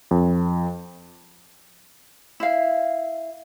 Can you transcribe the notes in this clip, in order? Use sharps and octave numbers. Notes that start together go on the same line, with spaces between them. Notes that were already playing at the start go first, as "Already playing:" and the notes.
F2
E4 F5